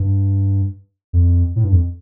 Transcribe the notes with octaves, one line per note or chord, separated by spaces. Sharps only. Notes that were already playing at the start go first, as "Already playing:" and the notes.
Already playing: G2
F2
A2
G2
F2